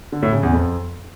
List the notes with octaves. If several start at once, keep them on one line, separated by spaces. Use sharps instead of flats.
D3
A2
C#3
E2
F2